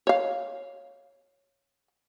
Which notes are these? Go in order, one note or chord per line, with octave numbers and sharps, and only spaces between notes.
C#5 F5